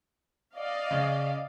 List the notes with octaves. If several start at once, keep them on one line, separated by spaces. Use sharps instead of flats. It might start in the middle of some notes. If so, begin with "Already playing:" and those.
D5 D#5 F5
C#3